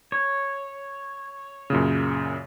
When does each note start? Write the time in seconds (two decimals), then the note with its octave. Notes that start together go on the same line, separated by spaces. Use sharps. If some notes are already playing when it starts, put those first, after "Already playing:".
0.12 C#5
1.70 F#2 A#2 C#3